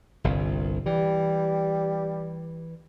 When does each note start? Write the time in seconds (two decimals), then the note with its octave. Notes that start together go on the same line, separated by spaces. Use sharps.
0.24 G1 C2
0.86 E3 G3